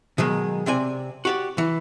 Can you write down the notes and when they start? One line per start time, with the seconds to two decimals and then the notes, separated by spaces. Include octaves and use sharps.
0.18 B2 D#3 F#3 G#3
0.66 C3 C4 D5 G#5
1.25 F#4 G4 D5
1.58 E3